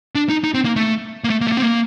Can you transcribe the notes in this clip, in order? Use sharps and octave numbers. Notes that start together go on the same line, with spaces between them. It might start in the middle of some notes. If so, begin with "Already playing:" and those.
D4
D#4
D#4
C4
A#3
A3
A#3
A3
A#3
A3
A#3
C4
A#3